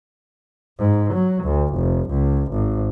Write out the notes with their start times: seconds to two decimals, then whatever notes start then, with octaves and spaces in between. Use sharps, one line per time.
0.78 G#2
1.13 F#3
1.44 D2
1.74 F1
2.10 C#2
2.52 G#1